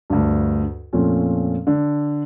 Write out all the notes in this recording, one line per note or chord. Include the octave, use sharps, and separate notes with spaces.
D2 G2
F2 A#2 F3 A3 C4 C#4
D3